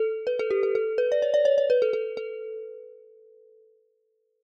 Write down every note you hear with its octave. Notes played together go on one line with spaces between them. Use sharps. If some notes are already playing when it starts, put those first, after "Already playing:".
Already playing: A4
B4
A4
G4
A4
A4
B4
D5
C#5
D5
C#5
C#5
B4
A4
A4
A4